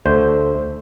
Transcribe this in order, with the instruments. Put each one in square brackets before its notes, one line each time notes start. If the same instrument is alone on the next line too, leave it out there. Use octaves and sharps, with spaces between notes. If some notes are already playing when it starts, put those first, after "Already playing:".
[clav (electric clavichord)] D2 [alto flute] A4 [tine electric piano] C5